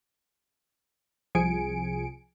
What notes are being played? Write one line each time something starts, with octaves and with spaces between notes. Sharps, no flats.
C2 F3 G#4 G#5 C#7 D7